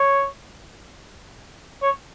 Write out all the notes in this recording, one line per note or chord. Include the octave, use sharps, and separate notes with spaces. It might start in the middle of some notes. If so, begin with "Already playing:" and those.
Already playing: C#5
C#5